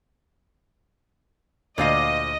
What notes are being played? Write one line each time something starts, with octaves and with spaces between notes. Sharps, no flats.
D2 A#2 C5 D#5 F5